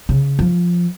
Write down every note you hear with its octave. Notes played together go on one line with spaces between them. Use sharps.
C#3
F3